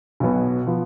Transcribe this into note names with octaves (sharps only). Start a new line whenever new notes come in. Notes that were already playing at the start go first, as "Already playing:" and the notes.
B1 B2 F#3 B3
F3 B3